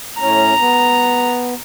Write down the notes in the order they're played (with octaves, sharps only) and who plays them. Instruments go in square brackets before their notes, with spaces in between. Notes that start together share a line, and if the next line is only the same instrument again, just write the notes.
[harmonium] A2 C#4 [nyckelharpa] A#5
[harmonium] B3